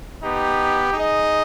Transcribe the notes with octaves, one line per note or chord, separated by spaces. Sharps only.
B3 D#4 G4
D#4 G#4 D#5